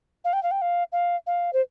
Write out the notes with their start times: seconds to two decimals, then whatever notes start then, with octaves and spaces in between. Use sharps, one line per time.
0.24 F5
0.33 G5
0.43 F5
0.51 G5
0.61 F5
0.92 F5
1.27 F5
1.53 C5